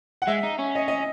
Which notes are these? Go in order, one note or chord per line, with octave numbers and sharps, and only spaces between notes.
F#5
G#3 E5
D#4
C#4
D#5
D#5